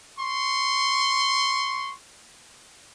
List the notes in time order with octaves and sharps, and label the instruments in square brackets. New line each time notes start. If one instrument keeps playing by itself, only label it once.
[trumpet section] C6 C#6